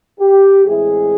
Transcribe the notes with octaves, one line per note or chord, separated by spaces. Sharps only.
G4
A2 E3 G#3 C4 E4 G#4